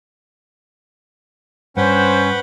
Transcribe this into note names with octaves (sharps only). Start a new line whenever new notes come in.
G2 C#4 B4 C5 F#5 G5